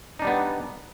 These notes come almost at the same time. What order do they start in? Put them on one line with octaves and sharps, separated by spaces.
D#4 D4 G3 B3